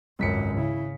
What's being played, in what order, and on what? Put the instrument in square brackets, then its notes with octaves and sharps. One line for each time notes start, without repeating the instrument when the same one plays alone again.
[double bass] G#1 F#2 [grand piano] C#2 B6 C#7
[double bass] C#3 [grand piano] E4